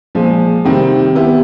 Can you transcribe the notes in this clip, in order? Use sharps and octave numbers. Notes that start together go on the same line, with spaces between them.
A#2 F3 G#3
C3 D#3 G3 C4
B3 E4 G4